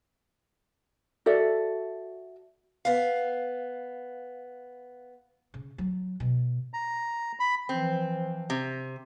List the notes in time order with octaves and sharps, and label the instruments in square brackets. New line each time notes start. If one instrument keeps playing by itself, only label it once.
[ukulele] F#4 A4 D5 E5
[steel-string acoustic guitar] B3 F5
[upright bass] C#3
F#3
B2
[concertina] A#5
B5
[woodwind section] E3 F3 [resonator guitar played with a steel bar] C4
[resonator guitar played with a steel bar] C3